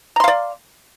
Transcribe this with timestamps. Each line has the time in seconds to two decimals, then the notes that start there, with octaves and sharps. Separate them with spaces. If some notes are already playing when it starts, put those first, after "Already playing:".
0.16 A#5
0.20 C6
0.24 F5
0.28 D5